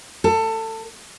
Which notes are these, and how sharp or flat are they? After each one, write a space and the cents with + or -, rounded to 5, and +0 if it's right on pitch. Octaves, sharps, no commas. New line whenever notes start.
A4 +25